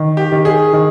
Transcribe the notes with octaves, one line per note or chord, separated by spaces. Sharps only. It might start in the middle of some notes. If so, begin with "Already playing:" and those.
Already playing: D#3
G4
D#3
G#4
D#3